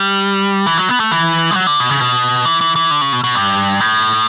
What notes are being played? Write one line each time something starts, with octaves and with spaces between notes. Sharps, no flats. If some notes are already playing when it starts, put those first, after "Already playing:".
Already playing: G3
E3
F#3
B3
A3
E3
G3
F#3
D3
B2
C#3
B2
E3
E3
E3
D3
C#3
B2
B2
G2
A2